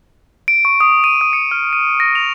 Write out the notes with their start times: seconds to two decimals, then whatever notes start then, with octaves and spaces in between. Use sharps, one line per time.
0.48 D7
0.65 C#6
0.81 D#6
1.04 D#7
1.21 D#6
1.33 C#7
1.51 F6
1.73 D#7
2.00 A#6
2.15 F7